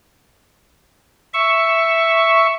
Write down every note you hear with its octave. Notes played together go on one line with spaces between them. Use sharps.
E5 C#6